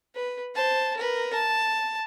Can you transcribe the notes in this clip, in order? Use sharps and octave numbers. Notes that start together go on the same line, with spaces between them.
B4
C5 A5
A#4 B4
A5